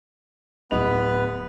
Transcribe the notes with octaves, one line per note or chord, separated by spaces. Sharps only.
D1 B3 B4 D#5 F7